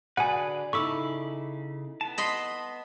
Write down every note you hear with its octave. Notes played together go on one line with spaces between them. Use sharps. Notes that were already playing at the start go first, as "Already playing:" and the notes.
D3 F#4 G#4 B4 D5 F#5 G#5
C#3 D#4 E4 A4 B5 C#6 D6 E6
B3 A5
D#5 B5 C6